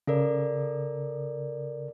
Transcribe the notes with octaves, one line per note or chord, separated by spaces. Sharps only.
C#3 A4 A#4 D5